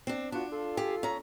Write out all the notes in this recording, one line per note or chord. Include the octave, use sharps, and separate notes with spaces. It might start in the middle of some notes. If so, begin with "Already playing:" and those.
C4 D4
B3 D4 F4 F#4
F4 A4
G4 G#4
C#4 A#5